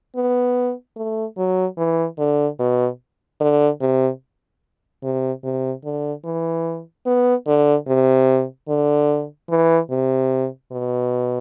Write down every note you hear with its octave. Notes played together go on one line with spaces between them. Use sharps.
B3
A3
F#3
E3
D3
B2
D3
C3
C3
C3
D3
E3
B3
D3
C3
D3
E3
C3
B2